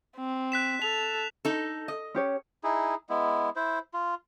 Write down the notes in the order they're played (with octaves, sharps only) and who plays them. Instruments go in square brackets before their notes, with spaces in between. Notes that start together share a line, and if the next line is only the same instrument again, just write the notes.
[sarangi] C4
[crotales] F#6 B6 E7
[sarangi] A4 [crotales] F7
[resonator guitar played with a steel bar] D#4 A4
D#5
[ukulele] C#4 G4 C#5
[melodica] D#4 E4 G#4
G#3 B3 E4
E4 C5
F4